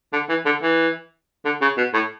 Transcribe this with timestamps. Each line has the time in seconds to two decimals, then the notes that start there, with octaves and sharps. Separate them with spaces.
0.13 D3
0.29 E3
0.46 D3
0.63 E3
1.45 D3
1.61 C#3
1.77 B2
1.94 A2